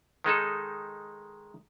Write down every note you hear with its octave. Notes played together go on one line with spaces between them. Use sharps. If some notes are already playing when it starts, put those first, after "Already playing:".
D#3 G#3 D#4 A4